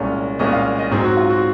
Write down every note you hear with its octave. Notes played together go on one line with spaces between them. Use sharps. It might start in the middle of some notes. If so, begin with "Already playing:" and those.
Already playing: C2 A#2 G#3 C#4
C2 A#2 G#3 C#4 D#5
F5
D#5
G#2 F#3 C4 G#4
F#4
F4
F#4